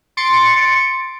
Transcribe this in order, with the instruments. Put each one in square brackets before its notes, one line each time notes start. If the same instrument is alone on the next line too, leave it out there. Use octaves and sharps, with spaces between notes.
[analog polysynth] C6 A6 C#7 D7